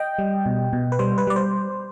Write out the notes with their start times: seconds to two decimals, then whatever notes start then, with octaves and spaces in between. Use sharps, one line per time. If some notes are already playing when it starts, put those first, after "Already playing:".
Already playing: D#5 G5
0.19 G3
0.46 B2
0.73 B2
0.92 B4
0.99 G3 C5
1.18 B4
1.27 G3 D5
1.36 C5